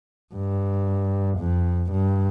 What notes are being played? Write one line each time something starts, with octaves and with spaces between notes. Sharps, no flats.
G2
F2
G2